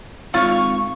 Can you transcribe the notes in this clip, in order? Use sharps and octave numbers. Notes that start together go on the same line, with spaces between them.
G#1 F4 F5 C#6